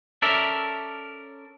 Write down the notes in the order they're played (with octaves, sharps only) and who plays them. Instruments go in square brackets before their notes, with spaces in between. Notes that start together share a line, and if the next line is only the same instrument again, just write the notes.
[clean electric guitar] C#4 A4 A#4 D5 E5